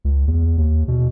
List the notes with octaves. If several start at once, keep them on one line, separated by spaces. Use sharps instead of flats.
C#2
E2
D#2
B2